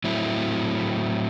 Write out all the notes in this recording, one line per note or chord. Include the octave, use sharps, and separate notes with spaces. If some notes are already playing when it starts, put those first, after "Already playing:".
A2 F#3 C4 E4